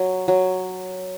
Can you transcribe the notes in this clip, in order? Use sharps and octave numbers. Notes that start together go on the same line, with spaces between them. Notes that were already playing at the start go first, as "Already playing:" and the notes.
Already playing: F#3
F#3